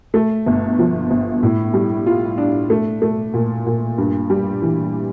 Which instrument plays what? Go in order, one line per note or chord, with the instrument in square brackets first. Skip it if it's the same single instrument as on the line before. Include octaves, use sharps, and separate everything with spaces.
[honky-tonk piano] A3
G1
F3
G1
A2
G3
F4
D4
A3
A3
A#2
A#2
G2
G3
E3